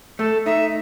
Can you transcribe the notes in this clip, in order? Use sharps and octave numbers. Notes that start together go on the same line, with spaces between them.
A3 A4
D#4 E5